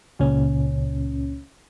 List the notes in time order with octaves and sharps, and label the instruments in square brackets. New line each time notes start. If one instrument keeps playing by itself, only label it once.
[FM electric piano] C#2 A#2 C#3 C#4